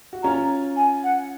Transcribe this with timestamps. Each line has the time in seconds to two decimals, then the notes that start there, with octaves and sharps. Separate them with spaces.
0.13 F#4
0.23 C#4 F4 A#5
0.76 G#5
1.03 F#5